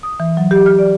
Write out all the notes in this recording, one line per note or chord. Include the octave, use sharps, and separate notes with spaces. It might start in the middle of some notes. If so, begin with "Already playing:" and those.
D#6
E3
F#3
G4
F6
D5